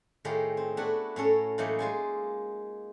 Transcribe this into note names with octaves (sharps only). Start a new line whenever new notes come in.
A2 D#3 F4 G4 G#4 A#4
C4
A3 B3 D4 E4 F#4
A2 C#4 A4 A#4
A2 E3 F#3 A#3 D#4
G#3 F4 G#5